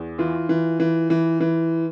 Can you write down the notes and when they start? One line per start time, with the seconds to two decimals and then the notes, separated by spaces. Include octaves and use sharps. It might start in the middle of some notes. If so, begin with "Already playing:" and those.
Already playing: E2
0.18 E3 F4
0.49 E3
0.80 E3
1.10 E3
1.41 E3